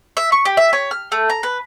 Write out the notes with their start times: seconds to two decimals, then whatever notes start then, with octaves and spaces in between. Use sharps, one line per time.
0.17 E5
0.32 C#6
0.45 G4
0.57 E5
0.73 C#5
0.91 F6
1.12 A3
1.30 A#5
1.43 B4